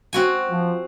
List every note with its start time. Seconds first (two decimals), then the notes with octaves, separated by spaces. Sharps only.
0.13 C4 F#4 G#5
0.51 F3